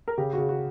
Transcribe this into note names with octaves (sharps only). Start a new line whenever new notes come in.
A#4
C#3 G4
C#3 F#4
F#4